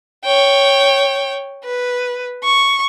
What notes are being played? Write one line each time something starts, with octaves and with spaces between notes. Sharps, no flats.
C#5 G5
B4
C#6